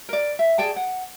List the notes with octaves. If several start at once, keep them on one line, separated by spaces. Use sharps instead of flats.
A#4 D5
E5
G#4 D5 G5 A5
F#5